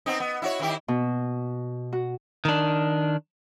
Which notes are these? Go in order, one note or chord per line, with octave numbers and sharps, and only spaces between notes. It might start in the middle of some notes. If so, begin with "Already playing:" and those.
B3 C4 D#4
B3
E4 F#4 C#5
D#3 E4 G4
B2
F#4
D#3 D4